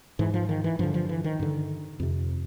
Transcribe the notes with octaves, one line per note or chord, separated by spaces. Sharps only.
G#2 E3
F3
D#3
E3
G2 D3 F3
F3
E3
D#3
G2 D3
F2 C3